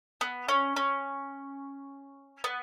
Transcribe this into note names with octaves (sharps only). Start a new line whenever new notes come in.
B3
C#4
C#4
B3